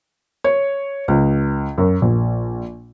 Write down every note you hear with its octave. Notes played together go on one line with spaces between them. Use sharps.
C#5
C#2
F#2
A#1